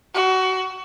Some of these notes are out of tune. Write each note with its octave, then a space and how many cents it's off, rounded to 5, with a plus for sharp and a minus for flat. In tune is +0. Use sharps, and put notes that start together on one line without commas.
F#4 +25